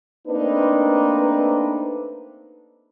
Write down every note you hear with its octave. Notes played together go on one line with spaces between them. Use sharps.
A3 A#3 C4 D4 D#4 B4